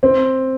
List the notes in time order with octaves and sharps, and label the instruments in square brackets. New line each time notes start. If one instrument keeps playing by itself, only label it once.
[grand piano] C4